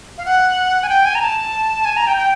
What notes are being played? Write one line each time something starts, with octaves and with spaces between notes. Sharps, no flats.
F5
F#5
G#5
G5
G#5
A#5
A5
G#5
A#5
G5
G5